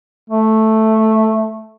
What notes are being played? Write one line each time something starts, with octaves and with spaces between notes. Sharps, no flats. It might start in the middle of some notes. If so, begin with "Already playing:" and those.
A3